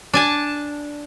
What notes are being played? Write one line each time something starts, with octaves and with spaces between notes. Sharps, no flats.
D4 G#5 A5